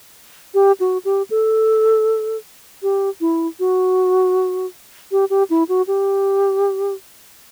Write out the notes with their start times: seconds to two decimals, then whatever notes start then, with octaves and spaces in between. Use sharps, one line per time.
0.54 G4
0.80 F#4
1.05 G4
1.30 A4
2.83 G4
3.21 E4
3.60 F#4
5.12 G4
5.30 G4
5.50 E4
5.69 F#4
5.87 G4